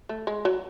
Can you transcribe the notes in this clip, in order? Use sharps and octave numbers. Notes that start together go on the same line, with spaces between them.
A3
G#3
F#3